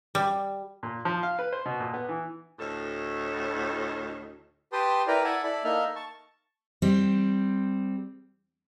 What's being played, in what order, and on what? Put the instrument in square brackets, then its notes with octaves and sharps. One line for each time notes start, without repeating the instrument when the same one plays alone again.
[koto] G3
[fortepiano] A#2
F3
F5
B4
C5
B2
A#2
B3
E3
[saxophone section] D2 A2 D#4 A4 C#5
[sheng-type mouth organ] G4 B4 G5 A5 C6 D#6
E4 A#4 B4 D5 G5 A#5
E5 F#5 G#5 A5 D6
E4 A4 D5 B5
A#3 D#4 A4 D#5 E5 F6
A5 C#6
[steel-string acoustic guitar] G3 C4